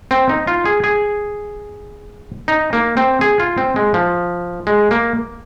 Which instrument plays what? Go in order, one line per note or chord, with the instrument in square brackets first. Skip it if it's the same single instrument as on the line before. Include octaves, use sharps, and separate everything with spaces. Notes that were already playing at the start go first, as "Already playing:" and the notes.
[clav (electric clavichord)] C4
D#4
F4
G#4
G#4
D#4
A#3
C4
G#4
F4
C4
G#3
F3
G#3
A#3